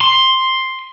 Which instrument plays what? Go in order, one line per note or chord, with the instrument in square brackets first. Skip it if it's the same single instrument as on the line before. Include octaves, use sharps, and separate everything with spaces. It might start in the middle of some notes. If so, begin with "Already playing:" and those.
[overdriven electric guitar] C6